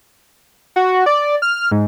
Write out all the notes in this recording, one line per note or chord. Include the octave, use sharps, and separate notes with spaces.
F#4
D5
F6
G#2